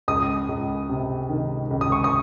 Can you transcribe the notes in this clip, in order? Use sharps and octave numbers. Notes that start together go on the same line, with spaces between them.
C#2 D#6
C#2
C3
D#3
C#2
D#6
C#6
D#6